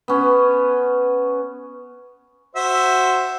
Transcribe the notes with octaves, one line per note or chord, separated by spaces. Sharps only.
B3 C#4
F#4 C5 E5